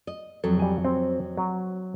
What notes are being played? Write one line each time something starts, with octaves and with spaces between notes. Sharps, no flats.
D#5
F2 F#3 A4
G3 G#5
C4
F#3